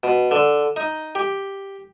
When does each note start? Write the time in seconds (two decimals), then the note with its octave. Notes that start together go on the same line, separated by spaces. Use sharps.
0.03 B2
0.31 D3
0.76 D#4
1.15 G4